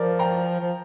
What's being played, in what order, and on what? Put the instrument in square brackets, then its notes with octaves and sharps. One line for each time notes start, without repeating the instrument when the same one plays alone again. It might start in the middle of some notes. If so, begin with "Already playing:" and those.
Already playing: [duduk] F3 [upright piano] A#4 D5
[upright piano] G5 A#5
[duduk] F3